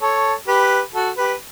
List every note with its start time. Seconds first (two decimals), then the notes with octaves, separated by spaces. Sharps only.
0.01 A4 C#5
0.48 G4 B4
0.94 F#4 A4
1.17 G4 B4